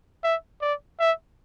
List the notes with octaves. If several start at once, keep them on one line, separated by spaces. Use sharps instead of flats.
E5
D5
E5